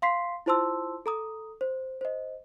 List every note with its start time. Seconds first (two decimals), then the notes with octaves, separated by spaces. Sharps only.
0.02 F5 C6 B6 C7
0.46 E4 F4 C5 A5 C6 E6
1.06 A4 A#5 D#6
1.61 C5
2.01 C5 D#5